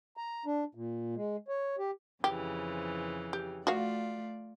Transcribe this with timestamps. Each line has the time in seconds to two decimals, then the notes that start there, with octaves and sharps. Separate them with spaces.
0.17 A#5
0.46 D4
0.75 A#2
1.15 G#3
1.48 C#5
1.78 G4
2.24 F2 C#3 E3 G4
3.33 G4
3.67 A3 F4 F#4 D5 F5